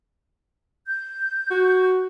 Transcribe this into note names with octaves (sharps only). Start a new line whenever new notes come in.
G6
F#4